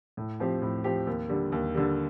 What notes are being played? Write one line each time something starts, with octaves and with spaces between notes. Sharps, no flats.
A2
F3 C4 G4
A2
F3 C4 G4
D#2
D3 G3
D#2
D3 G3